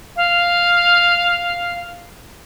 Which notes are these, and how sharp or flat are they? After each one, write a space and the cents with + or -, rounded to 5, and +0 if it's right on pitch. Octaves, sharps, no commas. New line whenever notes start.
F5 +0